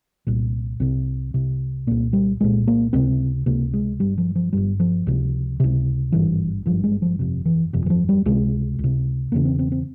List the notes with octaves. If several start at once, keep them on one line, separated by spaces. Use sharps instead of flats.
C2 A#2
C2 C3 C4
C2 C3
C2 A#2 A#3
G3
C2 A#2 G#3
A#3
C#2 C3 C4
C#2 C3 A#3
G#3
G1 G2 G3
F3
F3
G1 G2 G3
F3
C#2 C3
C#2 C3
G#1 G2 E3
G#1 G2 F3
G#3
F3
G1 F2 C3
E3
G1 F2 C3
E3
F3
G3
C#2 C3 G#3
C#2
C3
E1 E2 C#3 A#3
C4
C4
C4